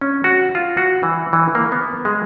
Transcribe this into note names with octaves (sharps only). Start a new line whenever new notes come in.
C#4
F#4
F4
F#4
E3
E3
A#3
B3
G#3